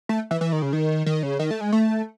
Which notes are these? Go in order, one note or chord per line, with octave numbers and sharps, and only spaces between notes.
A3
E3
E3
D#3
C#3
D#3
D#3
C#3
D#3
A3
G#3
A3